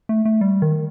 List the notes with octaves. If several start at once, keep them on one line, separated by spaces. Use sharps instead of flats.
A3
A3
G3
D#3